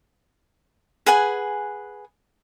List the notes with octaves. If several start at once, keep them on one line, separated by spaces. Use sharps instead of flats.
G#4 B4 F#5 G#5